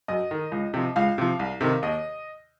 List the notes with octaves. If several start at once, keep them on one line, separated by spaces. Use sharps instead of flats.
F#2 D#5
D#3
C#2
C3 F3
C#2 F5
C3 F3
C2
C3 D#3
D#2 D#5